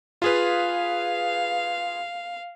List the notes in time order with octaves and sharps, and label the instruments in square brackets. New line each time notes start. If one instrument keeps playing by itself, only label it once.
[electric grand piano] F4 G#4 B4 [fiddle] F5